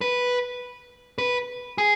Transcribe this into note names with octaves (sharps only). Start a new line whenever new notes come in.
B4
B4
G#4